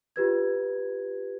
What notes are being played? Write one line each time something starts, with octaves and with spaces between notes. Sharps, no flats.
F4 G4 B4 G#6